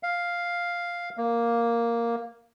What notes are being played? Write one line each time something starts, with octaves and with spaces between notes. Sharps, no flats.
F5
A#3